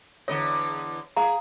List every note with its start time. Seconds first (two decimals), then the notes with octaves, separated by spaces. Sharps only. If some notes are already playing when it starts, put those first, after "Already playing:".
0.28 E2 D3 C#5 D#5
1.17 G#4 F5 A#5